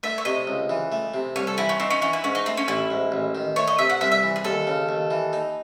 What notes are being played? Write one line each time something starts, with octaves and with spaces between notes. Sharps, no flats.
A3 E5
C#5
C3 D#5
C#2
E3
A3
C3
C2 C#5
A4
E3 E4
C#4
C4 D#4
C#4
E3 C#4
E4
G#2 C#4
D#4
A3 C4
C#4
A1 E4
G#2
A1
D#3
A3 C#5
D#5
C3 E5
F#5
C2 E5
E5
E3
G#4
D#2 A4
C#3
D#2
E3
D#4